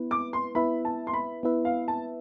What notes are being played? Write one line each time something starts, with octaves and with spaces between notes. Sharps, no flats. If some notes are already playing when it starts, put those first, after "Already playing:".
Already playing: B3 E4 B4
D6
C6
B3 E4 B4 E5 B5
A5
C6
B5
B3 E4 B4 E5
F5
A5